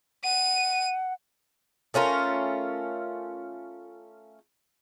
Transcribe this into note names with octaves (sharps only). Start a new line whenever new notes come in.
F#5 D#7
A3 C#4 F4 A#4